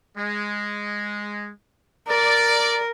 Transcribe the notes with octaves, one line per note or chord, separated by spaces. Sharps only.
G#3
A#4 D5